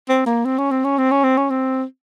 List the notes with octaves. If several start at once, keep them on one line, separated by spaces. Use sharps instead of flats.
C4
A#3
C4
C#4
C4
C#4
C4
C#4
C4
C#4
C4